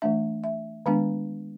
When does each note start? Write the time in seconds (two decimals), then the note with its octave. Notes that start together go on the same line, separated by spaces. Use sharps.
0.02 E3 A3 D4 E5
0.44 E5
0.86 D#3 G#3 B3 D4 F5